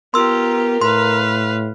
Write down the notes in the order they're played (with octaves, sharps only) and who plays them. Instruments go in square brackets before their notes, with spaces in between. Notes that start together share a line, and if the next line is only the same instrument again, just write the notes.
[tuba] B3 [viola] F4 G4 [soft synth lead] A#4 [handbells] C6 E6
[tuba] A2 [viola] B4 F5 [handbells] C6